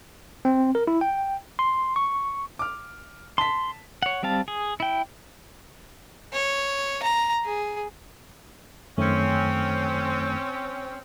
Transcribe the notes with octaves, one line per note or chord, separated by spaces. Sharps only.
C4
A#4
E4
G5
C6
C#6
D6 F6
A5 C6 B6
C#5 F#5
G3 C4 F5 A5
G#4
E4 G5
C#5
A#5
G#4
F#2 D#3 A3 C4 C#4